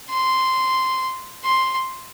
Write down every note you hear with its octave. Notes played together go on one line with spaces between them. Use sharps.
C6
C6